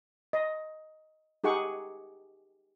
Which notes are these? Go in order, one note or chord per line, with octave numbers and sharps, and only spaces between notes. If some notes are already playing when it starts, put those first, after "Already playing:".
D#5
D#4 G4 G#4 F#5 C#6